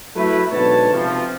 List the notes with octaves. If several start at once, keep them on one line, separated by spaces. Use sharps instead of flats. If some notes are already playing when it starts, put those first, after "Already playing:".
F#3 A3 E4 B4
G#2 B2 D3 B4 C#5 A5
C3 F3